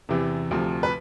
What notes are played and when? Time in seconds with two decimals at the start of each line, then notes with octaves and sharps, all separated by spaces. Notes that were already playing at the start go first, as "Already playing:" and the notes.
0.09 E2 C3 E3
0.51 D2 C3 F3
0.83 B4